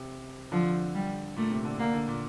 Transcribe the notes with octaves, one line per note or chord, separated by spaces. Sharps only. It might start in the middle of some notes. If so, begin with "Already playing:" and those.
Already playing: C3
D3 F3
G3
A#2 A3
C3
D3
D3 A#3
D3
A#2